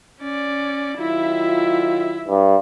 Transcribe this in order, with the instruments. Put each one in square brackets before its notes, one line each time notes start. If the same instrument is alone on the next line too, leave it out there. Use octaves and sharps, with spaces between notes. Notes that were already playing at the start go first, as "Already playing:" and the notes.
[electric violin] C#4 D5
[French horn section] D#3 F#3 F4 [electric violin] E4 E5
[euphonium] G2